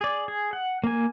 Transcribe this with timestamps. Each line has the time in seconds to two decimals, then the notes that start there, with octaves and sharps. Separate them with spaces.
0.01 G#4 D5
0.28 G#4
0.53 F#5
0.84 A#3 G#5